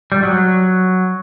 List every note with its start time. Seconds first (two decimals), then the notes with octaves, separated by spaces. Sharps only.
0.12 G3
0.23 F#3